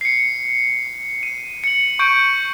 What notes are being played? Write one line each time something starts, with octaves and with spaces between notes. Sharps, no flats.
C7 C#7
D#7
C#7 F#7
C#6 G6 D7